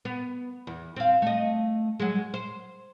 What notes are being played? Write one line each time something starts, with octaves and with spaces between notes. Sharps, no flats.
B3
E2
C4 F5
A3 D#5
F#3 G#3
C5